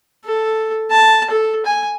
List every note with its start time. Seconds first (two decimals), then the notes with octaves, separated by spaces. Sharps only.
0.25 A4
0.91 A5
1.30 A4
1.66 G#5